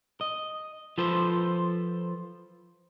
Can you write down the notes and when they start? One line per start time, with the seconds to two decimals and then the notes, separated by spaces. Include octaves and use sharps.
0.21 D#5
0.98 F3 F4 A4 B4 C5